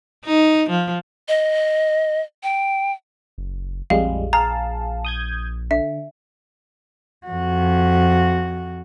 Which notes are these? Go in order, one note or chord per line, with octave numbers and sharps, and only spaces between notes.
D#4
F3
D#5
G5
F#1
A#1 F2 G3 G#3 F5
G#4 F5 A5 A#5
D#6 G6 G#6
D3 E5
F2 F#4